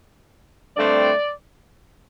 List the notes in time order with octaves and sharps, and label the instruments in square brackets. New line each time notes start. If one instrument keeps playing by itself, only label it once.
[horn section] G2 D3 A3 C4 D5